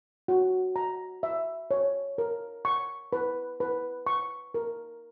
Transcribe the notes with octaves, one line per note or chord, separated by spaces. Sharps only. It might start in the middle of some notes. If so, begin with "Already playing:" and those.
F#4
A#5
E5
C#5
A#4
C#6
B4
B4
C#6
A#4